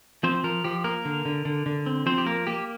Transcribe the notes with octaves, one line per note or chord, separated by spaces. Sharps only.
F3 C4 C5
F3 A#4
F3 G4
A#3 A#4
D3
D3
D3
D3
C4
F3 C4 C5
G4
A#3 A#4
A#3 G4